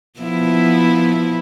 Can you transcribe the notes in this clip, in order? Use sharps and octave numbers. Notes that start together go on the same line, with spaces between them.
F3 B3 E4